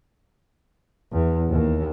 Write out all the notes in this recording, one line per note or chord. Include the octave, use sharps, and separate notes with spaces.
E2
D#2